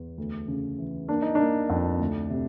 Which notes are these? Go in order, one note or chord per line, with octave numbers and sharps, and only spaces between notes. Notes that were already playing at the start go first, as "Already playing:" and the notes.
Already playing: E2
D2
C#3
E3
A#3 D4
D#4
A#3 D4
F2
D2
C3